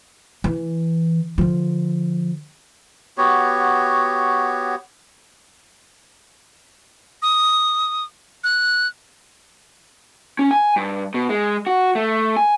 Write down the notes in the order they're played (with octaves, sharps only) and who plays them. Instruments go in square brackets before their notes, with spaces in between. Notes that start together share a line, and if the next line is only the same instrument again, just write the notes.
[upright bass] E3
D3 F3
[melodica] B3 F#4 G4 C#5
[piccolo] D#6
F#6
[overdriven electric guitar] C#4
G#5
G2
B2
G#3
F#4
A3
G#5